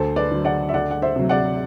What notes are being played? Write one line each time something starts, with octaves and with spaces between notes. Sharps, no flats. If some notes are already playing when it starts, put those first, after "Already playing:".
Already playing: D2 A4 C5
B4 D5
D3 F#3
D5 F#5
E5
D2 D5 F#5
F#5
C5 E5
C3 F#3
D5 F#5